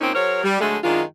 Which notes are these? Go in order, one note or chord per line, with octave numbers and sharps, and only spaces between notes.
A#2 A#3 C4 C#4 D#4
F#3 G#4 A#4 C5 C#5
G3
D3 F#3 G#3 A3
F#2 D#3 G#3 D4 F4